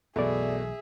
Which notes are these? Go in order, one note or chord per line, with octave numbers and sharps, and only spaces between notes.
B1 F#2 B2 E3 A3 G#4 D5 E5